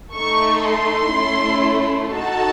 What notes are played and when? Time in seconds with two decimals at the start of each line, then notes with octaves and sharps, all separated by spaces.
0.13 A3 D#4 A4 C#6
0.62 C6
1.12 A3 C#4 E4
2.10 D#4 F#4 A4 A5